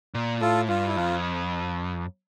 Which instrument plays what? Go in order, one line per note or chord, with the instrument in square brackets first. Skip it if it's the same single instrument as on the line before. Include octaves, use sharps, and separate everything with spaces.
[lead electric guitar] A#2
[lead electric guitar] A2 [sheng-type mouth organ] F4 A4
[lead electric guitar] G2 [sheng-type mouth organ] F4
[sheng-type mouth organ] E4
[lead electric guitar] F2 [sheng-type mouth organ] F4